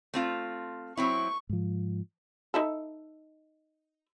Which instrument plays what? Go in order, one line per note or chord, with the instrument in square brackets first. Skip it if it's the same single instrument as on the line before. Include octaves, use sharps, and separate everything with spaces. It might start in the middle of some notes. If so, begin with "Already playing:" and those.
[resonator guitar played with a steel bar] A3 C4 F4
[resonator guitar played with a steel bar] F#3 C4 E4 [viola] C#6
[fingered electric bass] G#2 F3
[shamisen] D#4 E4 A4